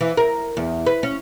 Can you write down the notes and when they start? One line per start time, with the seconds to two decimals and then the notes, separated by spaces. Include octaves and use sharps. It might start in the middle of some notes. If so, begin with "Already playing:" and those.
0.01 E3
0.17 A#4
0.57 E2
0.86 B4
1.03 C#4